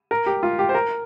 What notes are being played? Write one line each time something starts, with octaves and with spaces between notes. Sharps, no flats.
A#4
G4
F4
G4
C5
A#4